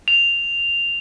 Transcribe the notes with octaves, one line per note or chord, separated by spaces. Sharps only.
F7